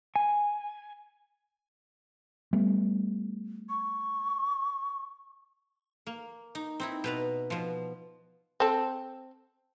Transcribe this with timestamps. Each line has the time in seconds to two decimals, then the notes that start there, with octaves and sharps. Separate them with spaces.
0.16 G#5
2.53 G3 A3 B3
3.69 C#6
6.07 A#3
6.55 D#4
6.80 C4 D#4 E4
7.04 B2 B4 A#5
7.50 B2 F3
8.60 C4 A4